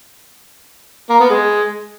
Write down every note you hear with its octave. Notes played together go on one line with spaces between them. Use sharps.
A#3
B3
G#3